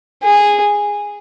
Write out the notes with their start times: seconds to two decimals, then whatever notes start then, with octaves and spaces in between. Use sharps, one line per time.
0.23 G#4